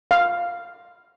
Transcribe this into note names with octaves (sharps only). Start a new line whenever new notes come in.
F5